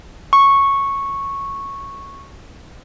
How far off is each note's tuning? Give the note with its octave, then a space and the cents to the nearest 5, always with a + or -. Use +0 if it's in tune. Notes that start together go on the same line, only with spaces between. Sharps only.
C#6 -5